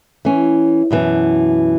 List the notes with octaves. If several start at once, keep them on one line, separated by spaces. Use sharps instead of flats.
E3 C#4
F#2 B2 E3